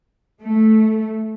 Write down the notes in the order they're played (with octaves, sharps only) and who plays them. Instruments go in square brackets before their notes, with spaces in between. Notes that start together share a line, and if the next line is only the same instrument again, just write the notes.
[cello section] A3